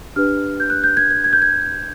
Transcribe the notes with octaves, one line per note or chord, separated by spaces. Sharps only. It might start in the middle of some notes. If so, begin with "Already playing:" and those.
D4 G4 B4 F6
G6
F#6
G6
G#6
G#6
G#6
G6
G#6